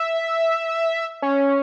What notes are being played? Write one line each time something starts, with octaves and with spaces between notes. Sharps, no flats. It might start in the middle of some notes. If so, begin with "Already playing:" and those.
Already playing: E5
C#4